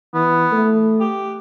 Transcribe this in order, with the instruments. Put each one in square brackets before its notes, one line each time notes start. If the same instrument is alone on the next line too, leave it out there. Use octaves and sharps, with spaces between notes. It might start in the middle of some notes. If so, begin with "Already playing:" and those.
[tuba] E3 [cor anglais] B3
[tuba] A3
[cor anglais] G4